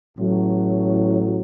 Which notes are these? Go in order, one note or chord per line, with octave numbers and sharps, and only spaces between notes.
A1 A2 F#3